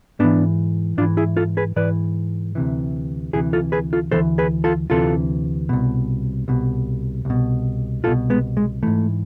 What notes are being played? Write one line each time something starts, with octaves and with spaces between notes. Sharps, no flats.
G#2 E3 B3 D4
G#2 E3 D4 F4
E4 G#4
F4 A4
G#4 B4
G#2 E3 B4 D5
D2 C3 E3
D2 C3 E3 E4 G#4
F4 A4
G#4 B4
F4 A4
D2 C3 E3 A4 C5
G#4 B4
F4 A4
D2 C3 E3 F4 A4
C2 B2
C2 B2
C2 B2
C2 B2 F4 A4
G#3 B3
G#3
G#2 E3 A3